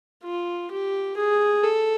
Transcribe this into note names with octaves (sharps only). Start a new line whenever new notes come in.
F4
G4
G#4
A4